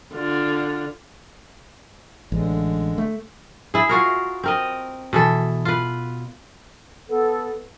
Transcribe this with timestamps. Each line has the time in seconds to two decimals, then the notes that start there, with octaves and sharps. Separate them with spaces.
0.14 D3 F4
2.32 A1 D3 G#3
2.98 A3
3.74 E4 G#4
3.89 F4 F#4 A#4
4.44 C4 A#4 D#5
5.13 B2 E3 A4
5.65 F4 B4
7.09 B3 A4